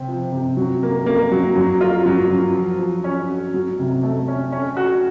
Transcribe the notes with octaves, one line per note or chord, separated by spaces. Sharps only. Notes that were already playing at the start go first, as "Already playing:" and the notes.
Already playing: C3 C4
F3
C3
F#3
A#3
A#3
F#3
F#3
F4
F#3
F#3
F3
F3
C#4
F#4
F#3
C3
A3
C#4
C#4
F#4